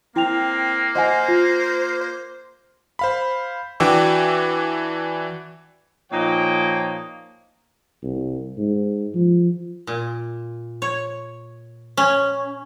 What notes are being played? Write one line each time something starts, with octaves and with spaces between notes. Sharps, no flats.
A#3 C4 E4 G5 F7
C5 D#5 F#5 G#5
F4
C5
C5 F5 B5
E3 D4 F#4 G5 D6 E6
A#2 F3 A#3 D#4 C#5 G5
C2
G#2
F3
A#2
C#5
C#4